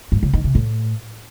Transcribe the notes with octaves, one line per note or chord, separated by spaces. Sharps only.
G2
C#3
D#3
C3
A2